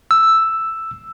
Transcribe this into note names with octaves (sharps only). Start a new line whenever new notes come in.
E6